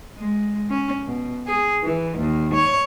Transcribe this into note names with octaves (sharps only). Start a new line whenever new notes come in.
G#3
C#4
B2
G#4
E3
D#2
C#5